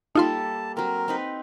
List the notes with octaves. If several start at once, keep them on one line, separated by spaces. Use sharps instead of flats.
G3 A#3 D#4 F4 A4 A5 C6
F#3 C4 A#4
C4 D#4 B4